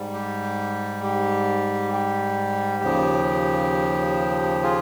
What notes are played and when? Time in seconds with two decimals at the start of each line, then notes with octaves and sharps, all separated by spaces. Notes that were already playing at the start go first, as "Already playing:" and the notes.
Already playing: G#2 G3
0.14 G4
1.04 G4
1.93 G4
2.83 D#2 C#3 F3
4.63 F4 G#4